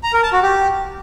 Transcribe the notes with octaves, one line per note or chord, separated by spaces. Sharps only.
A#5
A#4
A5
F#4
G4